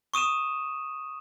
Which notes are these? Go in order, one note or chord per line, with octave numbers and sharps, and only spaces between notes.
C#6 D#6 D#7 E7